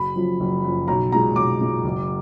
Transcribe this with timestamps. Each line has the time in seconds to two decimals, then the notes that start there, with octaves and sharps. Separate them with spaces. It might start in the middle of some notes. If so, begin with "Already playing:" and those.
Already playing: F#1 B5
0.16 F#2 F3
0.40 F#1
0.64 F#2 F3
0.88 B1 A#5
1.12 A#2 G#3 A#5
1.36 B1 D6
1.61 A#2 G#3
1.84 F#1